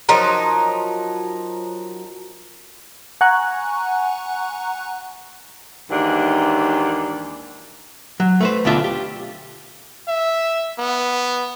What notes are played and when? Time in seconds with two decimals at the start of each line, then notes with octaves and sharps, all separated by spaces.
0.09 F3 F#3 D#4 A#4
3.21 F#5 G#5 A#5 C#6 F#6
5.90 D#2 G#2 E3 D4
8.20 F#3
8.41 A3 B4 C5
8.65 D2 B2 D4 F4 E5
8.84 G4
10.08 E5
10.78 B3